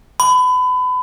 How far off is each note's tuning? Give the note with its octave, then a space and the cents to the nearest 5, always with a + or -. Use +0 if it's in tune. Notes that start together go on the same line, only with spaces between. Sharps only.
B5 +30